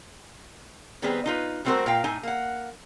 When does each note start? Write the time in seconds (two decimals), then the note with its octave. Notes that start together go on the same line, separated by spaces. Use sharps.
1.02 D#3 G3 B3 C4 G#4 B4
1.26 D#4 F4 B4
1.65 G3 A3 C4 F#4 A#4 C5
1.86 A#2 A#4 F5 G5
2.04 A2 D#4 G#5
2.23 A#3 F#5